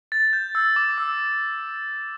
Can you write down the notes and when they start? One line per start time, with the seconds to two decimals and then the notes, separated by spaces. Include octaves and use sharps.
0.12 A6
0.33 G6
0.55 E6
0.76 D6
0.98 E6